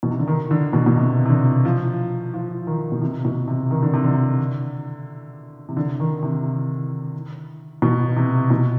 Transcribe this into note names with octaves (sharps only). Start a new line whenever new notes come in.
B2
C3
D3
D#3
D3
B2
B2
C3
C3
D3
F3
F3
D#3
B2
C3
B2
C3
D#3
D3
C3
D3
C3
D3
D#3
C3
B2
C3
B2